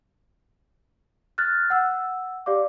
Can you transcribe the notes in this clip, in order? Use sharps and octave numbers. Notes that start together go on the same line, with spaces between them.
F6 F#6 A6
F#5 E6
G4 D5 F5 D6